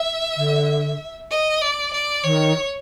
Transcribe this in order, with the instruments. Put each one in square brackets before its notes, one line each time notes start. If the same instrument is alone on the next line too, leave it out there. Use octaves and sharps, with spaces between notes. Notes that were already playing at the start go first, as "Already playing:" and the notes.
Already playing: [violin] E5
[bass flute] D3
[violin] D#5
D5
D5
[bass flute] D#3 [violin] C#5